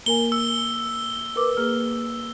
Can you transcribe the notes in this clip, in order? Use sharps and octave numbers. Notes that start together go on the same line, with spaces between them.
A#3 A#4 G#5 G7
E6
A#4 B4 D6
A#3 G#4 F6